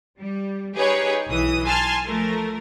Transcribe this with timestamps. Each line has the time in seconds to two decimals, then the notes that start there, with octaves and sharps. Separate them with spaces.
0.19 G3
0.76 D#4 G4 G#4 B4 C#5
1.29 B1 E3 D#6
1.66 G#5 A5 C6 F6
2.05 F3 A3 A#4